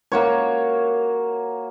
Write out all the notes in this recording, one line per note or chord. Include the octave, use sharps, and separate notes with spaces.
A#3 F#4 C#5